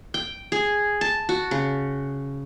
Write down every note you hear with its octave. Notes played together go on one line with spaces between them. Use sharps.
G5
G#4
A5
F#4
C#3